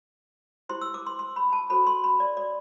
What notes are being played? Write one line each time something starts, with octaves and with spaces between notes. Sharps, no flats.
E4 G4 C5 C6
E6
D6
C6
C6
B5
A5
F#4 A4 C5 B5
C6
B5
D5
D5